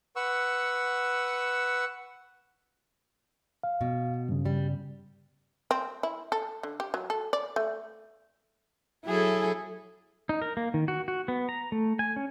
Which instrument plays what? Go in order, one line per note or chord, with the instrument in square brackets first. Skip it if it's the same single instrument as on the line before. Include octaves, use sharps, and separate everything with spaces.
[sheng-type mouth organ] B4 F#5 C#6 E6
[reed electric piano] F5
[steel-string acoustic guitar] B2
[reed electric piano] G2 C#3
[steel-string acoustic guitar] G3
[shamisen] C4
E4
A4
D3
G4
F#3
A4
D5
A3
[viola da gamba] F#3 A4 [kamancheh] E4 G#4
[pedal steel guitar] D#4
A#4
A#3
D#3
F#4
F#4
B3
A#5
A3
G#5
C#4